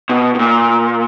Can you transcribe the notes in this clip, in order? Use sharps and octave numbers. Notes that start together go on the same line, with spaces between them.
B2
B2
A#2